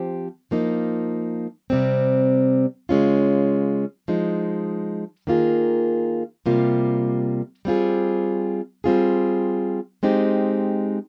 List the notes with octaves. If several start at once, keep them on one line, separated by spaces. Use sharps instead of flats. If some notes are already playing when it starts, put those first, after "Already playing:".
Already playing: F3 C4 G4
F3 A#3 D#4
C3 G3 C4
C#3 G#3 C#4 F4
F3 G#3 D#4
D#3 A#3 F4 G#4
C3 G3 A#3 F4
G3 C4 F4 G#4
G3 C4 F4 G#4
G#3 C4 D#4 G4